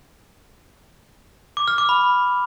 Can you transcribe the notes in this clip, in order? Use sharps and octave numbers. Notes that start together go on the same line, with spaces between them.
D6
F6
D6
B5